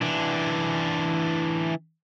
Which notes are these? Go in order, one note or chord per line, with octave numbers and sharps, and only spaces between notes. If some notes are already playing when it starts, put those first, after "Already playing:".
E3 D4